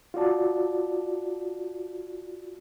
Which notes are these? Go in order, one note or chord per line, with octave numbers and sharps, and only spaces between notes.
F4 F#4 D5 A5